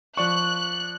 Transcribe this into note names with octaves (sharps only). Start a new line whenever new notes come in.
F3 D5 C#6 F#6